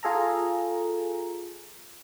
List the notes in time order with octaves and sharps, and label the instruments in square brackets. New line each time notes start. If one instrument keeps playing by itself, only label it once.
[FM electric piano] F4 G#4 A4 A#5